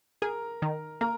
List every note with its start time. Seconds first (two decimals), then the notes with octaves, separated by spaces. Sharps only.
0.22 G#4 A#4 A#5
0.62 D#3
1.01 A#3 A#4 A#5